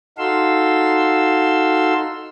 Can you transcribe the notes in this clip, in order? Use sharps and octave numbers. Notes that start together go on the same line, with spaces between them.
D#4 F#4 A4 F5 C6 E6